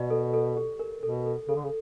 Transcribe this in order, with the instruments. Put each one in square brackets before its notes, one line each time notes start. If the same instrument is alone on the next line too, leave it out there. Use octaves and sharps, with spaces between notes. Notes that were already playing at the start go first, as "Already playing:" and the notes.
Already playing: [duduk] B2 [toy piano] D5
[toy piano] A4
A4
G4
A#4
[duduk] B2 [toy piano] A4
[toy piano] A4
[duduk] C#3 [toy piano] A4
[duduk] D3
C#3